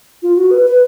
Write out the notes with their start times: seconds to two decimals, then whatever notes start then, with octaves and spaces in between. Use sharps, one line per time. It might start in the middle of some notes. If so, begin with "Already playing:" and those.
0.23 F4
0.37 F#4
0.51 B4
0.66 B4